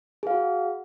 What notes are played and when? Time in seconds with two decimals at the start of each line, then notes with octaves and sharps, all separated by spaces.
0.23 G#4
0.27 F5
0.31 F#4
0.34 F#5